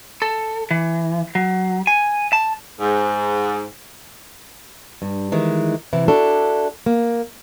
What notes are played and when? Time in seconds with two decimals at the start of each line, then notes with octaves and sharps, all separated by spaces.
0.22 A4
0.71 E3
1.35 F#3
1.87 G#5
2.33 A5
2.81 G#2
5.02 G2
5.32 D#3 E3 G#3
5.93 C3 E3 E4
6.08 D4 E4 F#4 A4
6.86 A#3